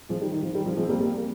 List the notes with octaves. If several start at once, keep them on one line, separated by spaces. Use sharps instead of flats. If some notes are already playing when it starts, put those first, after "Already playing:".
F3 G#3
D#3 G3
D#3
F3
D#3 G3
F3
F3 G#3
C4
G3 A#3
G3 A#3
A#3